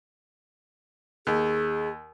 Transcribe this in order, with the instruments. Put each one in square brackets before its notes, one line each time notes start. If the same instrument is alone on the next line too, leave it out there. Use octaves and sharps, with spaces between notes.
[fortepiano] D#2 [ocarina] G#4